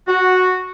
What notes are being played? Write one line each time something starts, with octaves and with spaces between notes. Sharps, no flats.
F#4